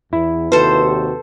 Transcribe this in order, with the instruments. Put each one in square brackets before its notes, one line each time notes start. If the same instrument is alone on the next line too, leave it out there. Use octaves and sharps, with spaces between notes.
[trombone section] E2 [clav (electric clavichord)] E4
[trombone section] D#2 C3 F#4 [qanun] A4 C5 [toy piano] B4